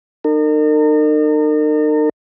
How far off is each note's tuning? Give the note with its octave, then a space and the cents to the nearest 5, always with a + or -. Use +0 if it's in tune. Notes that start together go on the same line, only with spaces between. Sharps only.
D#4 -40 A#4 -40